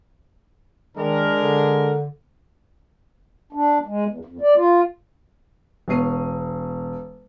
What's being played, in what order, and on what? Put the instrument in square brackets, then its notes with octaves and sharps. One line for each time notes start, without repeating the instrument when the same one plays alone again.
[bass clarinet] D#3 [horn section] G#3 D4 A#4
[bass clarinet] D3
[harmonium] D4
G#3
E2
F2
D5
F4
[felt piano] E1 B3 C#5 C7 D#7